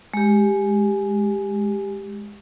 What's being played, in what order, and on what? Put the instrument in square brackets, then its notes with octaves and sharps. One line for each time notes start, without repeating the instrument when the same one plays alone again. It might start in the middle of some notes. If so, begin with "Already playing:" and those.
[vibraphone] G#3 G4